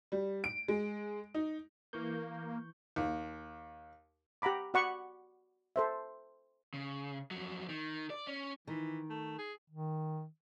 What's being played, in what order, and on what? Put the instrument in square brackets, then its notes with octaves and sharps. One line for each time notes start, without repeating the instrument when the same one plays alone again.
[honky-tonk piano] G3
D7
G#3
D#4
[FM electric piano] E3 C#6 G6 [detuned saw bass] A#3
[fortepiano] D#2
[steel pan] G4 F#5 A#5 B5 D6
F#4 D5 F#5 B5 C#6
A4 C5 E5
[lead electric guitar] C#3
F2 F#3
D#3
D5
C#4
[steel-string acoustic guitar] D#3 [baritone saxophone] E3
[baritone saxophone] A3
G#4
[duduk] D#3